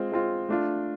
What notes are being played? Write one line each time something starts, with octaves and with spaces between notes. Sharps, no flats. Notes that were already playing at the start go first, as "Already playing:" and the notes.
Already playing: G#3 C4 F4
G#3 C4 F4
A3 D4 F4